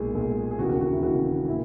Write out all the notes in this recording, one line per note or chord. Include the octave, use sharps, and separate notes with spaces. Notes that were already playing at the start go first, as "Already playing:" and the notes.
Already playing: B1 A#2 G#3 G#4
B1 A#2 G#3
G#4
E1 D#2 C#3 E3 F#4
F#4
F#4
E4
E1 D#2 C#3 E3 F#4
A#2 E4